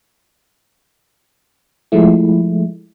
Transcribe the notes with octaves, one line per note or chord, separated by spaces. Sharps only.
F3 G#3 A3 E4